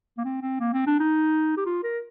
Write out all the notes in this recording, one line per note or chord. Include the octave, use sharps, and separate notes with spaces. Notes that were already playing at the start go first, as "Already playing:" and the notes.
A#3
C4
C4
A#3
C4
D4
D#4
G4
F4
A#4